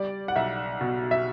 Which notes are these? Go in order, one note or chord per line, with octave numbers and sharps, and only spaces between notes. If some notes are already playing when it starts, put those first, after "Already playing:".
Already playing: G3 D5
F#5
B1 E5
B2
E5